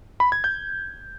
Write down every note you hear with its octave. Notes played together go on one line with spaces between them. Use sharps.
B5
G#6
G6